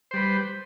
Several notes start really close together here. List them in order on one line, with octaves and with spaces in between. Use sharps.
C5 G3 B4